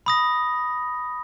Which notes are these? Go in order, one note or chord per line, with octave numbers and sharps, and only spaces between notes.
B5 D#6 A#6